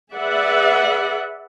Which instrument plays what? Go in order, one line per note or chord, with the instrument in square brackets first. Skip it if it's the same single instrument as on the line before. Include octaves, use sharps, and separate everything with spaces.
[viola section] G#4 B4 D5 E5 F#5